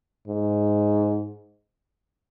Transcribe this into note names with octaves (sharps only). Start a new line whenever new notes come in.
G#2